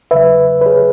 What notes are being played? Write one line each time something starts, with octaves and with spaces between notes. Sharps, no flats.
E2 C#3 F#3 B4 E5
B4
G#4 C#5